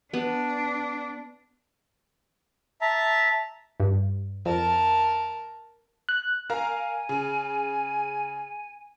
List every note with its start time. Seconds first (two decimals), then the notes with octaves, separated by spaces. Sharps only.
0.13 B3 D4
2.81 E5 A5 A#5
3.80 G2
4.46 F2 A#4 A5
6.09 F#6
6.50 A#4 F5 G#5 A#5
7.09 C#3